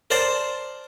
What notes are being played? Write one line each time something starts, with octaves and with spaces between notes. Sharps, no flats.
A#4 C5 D5 A5 C6